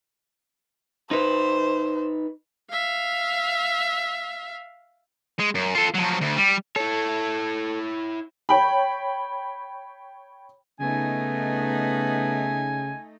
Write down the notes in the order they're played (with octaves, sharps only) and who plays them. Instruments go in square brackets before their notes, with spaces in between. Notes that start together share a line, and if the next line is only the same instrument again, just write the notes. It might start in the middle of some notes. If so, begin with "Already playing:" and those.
[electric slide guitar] D#4 B4 [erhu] C5
[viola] E5 F5
[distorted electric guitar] G#3
F#2
F4 A4
F3 F#3
D2
G3
[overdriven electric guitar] E4 C#5 [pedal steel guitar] A4
[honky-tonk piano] C#5 G5 B5
[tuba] C#3 [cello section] A3 D#4 [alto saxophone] B3 [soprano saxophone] G#5